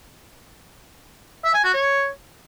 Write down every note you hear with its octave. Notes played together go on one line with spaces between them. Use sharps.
E5
G#5
F#4
C#5